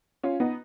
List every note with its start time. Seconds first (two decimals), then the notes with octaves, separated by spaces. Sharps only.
0.23 C#4 F4
0.40 B3 D#4